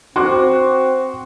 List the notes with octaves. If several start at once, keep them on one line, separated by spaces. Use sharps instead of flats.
C4 F#4 C6 D6 F#6